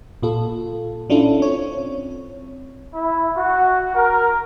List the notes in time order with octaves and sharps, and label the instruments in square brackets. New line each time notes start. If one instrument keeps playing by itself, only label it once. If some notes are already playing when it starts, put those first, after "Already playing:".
[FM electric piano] A#2 F4 A4
C#4 D4 E4 F4 A4
C4 C#5
[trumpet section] E4
F#4
A#4